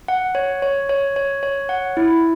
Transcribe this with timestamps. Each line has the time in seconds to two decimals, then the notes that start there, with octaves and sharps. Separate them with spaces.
0.08 F#5
0.35 C#5
0.62 C#5
0.89 C#5
1.16 C#5
1.43 C#5
1.69 F#5
1.97 E4